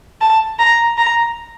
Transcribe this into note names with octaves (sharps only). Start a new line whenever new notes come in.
A5
A#5
A#5